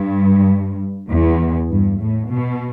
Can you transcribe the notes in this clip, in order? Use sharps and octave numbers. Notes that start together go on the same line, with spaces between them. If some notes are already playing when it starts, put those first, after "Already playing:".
Already playing: G2
E2
G2
A2
B2